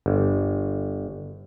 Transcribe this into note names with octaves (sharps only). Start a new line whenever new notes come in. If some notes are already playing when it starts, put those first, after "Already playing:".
G1